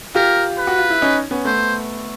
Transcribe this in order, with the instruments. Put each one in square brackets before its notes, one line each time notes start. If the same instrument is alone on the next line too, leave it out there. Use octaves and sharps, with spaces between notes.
[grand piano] F4 G4 [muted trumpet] A#4
[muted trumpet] B4
[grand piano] F#4
F4
E4
C#4 D#4
B3 C#4
[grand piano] A3 B3 [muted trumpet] C5